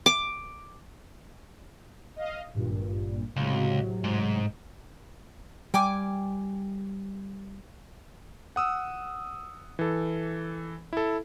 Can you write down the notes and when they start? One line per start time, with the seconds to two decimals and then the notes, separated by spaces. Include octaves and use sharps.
0.06 D6
2.16 D#5 F5
2.54 G#1 G2 A#2
3.36 C#2 A2 C3 F#3
4.04 G#2
5.74 G3 G5 G#5 D6
8.56 F#5 D#6 E6
9.79 E3 A4
10.93 E4 A4